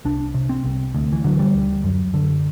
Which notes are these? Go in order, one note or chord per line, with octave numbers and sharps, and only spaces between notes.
C2 D4
C3
C4
C2
D2
E3
D3 F#3
G3
D2
F#2
D3